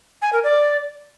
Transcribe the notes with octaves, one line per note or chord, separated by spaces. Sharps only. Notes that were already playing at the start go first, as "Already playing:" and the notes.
G#5
A#4
D5